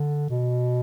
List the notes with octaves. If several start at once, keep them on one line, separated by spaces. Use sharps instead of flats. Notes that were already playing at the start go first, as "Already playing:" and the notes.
Already playing: D3
B2